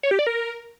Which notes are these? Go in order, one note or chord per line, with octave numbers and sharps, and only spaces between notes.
C#5
G4
D5
A#4